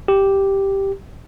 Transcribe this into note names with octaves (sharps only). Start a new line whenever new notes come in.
G4